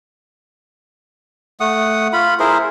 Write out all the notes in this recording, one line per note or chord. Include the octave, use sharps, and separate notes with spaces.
A3 F#5 D#6
F4 B5
E4 G#4 A#4 C5